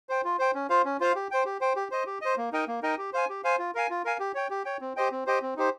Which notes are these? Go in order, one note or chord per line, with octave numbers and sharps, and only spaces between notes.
C5 G5
F4
C5 G5
C#4
F4 C5 F5
C#4
F4 C5 F5
G4
C5 G5
G4
C5 G5
G4
C5 D#5
G4
C5 D#5
A#3
D#4 A#4 D#5 G5
A#3
D#4 A#4 D#5 G5
G4
C5 F5 G#5
G4
C5 F5 G#5
F4
A#4 F5 G#5
F4
A#4 F5 G#5
G4
C#5 G5
G4
C#5 G5
C4
G4 C5 D#5 G5
C4
G4 C5 D#5 G5
C4
D#4 G4 C5